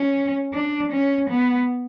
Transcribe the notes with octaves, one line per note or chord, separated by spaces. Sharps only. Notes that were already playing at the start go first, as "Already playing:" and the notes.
Already playing: C#4
D4
C#4
B3